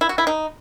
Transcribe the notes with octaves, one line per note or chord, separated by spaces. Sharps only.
E4
F#4
E4
D#4